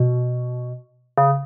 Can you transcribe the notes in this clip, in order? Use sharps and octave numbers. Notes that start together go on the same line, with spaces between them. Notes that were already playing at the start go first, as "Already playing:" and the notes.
Already playing: B2
C#3